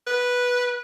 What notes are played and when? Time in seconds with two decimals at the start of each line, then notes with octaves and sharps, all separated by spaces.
0.07 B4